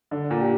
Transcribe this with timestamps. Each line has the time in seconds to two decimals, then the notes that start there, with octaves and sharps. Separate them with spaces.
0.11 D3 D4
0.31 A#2
0.40 G4